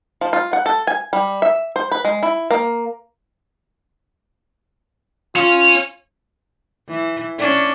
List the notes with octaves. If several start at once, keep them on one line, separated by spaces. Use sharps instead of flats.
F3
F4
F#5
A4
G#5
G3
E5
C5
B4
G#3
E4
A#3
C#4 F4
E3
C#4 D4